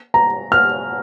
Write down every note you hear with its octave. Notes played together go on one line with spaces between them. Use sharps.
A#5
F6